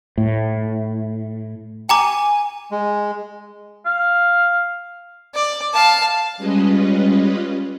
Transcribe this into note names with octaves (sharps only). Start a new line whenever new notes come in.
A2
G5 G#5 A#5 D6
G#3
F5
D5
F5 A5
G3 G#3 C#4 F4 B4 D#5